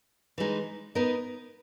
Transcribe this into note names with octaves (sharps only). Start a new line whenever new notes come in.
E3 G#3 D#4
B3 D#4 A#4 D#5